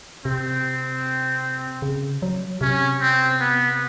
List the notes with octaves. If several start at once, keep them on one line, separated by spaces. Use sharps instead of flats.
C3 C4
C#3
F#3
C3 C#4
C4
B3